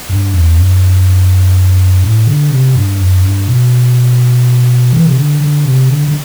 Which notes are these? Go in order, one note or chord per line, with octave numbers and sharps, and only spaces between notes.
G2
E2
F#2
A2
D3
C3
G2
F#2
G2
B2
E3
C3
D3
D3
C3
D3
D3